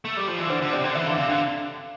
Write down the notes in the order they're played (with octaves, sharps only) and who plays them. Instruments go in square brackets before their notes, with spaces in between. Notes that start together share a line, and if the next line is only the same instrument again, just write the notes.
[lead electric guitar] A3
G3
F3
E3
[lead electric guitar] D3 [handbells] C5
[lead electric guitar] D3
[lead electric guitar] C3 [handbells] D5
[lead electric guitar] D3
[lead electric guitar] E3 [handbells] E5
[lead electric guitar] D3 [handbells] F5
[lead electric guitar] C3 [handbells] F5
[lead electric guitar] D3